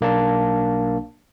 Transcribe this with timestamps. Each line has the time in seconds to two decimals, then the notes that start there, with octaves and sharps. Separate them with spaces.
0.01 B1 A#3 D4 A5